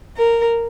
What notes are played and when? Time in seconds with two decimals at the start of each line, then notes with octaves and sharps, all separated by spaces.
0.16 A#4